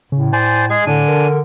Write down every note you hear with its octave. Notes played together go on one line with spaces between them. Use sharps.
A2 C#3
C5 D5 G#5
G#3 G#4 G#6
A2 D3 D4 G#5
A#4